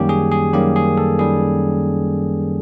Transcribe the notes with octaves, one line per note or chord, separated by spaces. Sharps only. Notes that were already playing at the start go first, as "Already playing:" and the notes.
Already playing: F#2 D#3 G3 A#3 C#4 G4
G#4
G#4
F#2 D#3 G3 A#3 C#4 G4
G#4
A4
D#3 G3 G#4